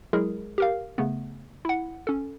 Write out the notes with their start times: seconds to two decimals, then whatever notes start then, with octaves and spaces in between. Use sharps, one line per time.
0.13 F#3 G#3 E4 G#4 A#4
0.58 G4 A#4 F5
0.98 C#3 A3 B3
1.65 E4 F#5
2.07 C#4 A4